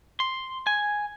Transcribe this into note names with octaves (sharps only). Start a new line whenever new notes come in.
C6
G#5